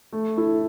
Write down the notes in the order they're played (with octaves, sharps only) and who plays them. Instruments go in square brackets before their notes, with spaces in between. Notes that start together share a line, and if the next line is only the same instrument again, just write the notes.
[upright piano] A3
E4 A4